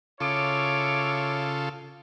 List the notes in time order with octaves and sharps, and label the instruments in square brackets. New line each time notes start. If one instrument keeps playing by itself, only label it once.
[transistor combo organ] C#3 F4 A4 [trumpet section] E4 C#5 D6